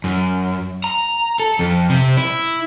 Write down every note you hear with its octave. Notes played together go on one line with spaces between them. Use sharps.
F#2
A#5
A4
F2
C3
E4